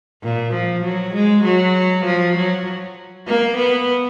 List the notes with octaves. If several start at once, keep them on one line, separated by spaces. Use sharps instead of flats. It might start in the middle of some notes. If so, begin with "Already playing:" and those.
A#2
F3
F#3
G#3
F#3
F3
F#3
A#3
B3